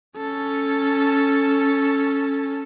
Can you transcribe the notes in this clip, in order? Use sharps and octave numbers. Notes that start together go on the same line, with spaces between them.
C#4 A4